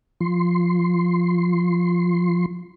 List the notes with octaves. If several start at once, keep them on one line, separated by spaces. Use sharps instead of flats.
F3 C6